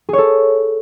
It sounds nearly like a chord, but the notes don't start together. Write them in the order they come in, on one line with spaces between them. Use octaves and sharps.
G#4 C#5 A4